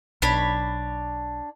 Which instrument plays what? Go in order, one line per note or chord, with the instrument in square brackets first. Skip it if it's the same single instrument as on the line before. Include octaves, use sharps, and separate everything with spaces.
[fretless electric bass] B1 [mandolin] D4 C#5 B5